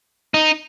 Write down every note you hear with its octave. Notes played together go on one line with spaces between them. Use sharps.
D#4